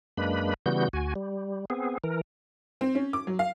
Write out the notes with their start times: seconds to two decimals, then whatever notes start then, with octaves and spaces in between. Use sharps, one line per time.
0.17 F#2 G#3 A#3 D4 B4 B5
0.66 C#3 E3 G3 B3 F#4 G6
0.93 D2 F#4 G#5
1.16 G3
1.70 B3 C4 G#4
2.04 E3 A#4
2.81 C4
2.95 C#4
3.13 D6
3.27 F#3
3.39 F5